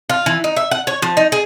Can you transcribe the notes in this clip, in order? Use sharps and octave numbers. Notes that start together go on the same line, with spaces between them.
F4
E3
D#4
E5
F#5
C#5
F3
D#4
G#4